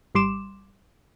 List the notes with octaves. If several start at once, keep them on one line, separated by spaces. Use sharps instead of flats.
G#1 G3 C6 D6 E7